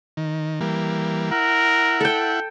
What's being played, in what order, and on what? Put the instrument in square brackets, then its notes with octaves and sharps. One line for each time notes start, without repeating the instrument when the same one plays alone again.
[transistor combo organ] D#3
E3 G3 A#3
[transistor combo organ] E4 F#5 [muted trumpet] A#4
[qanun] A4 G5